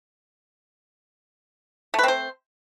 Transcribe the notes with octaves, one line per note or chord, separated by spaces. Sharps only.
A3 C4 B4 C5